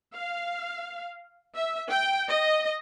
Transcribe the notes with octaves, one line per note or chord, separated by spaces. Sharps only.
F5
E5
G5
D#5